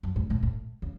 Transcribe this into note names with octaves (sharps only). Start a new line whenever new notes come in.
F#2
G#2
A2
A2
C#3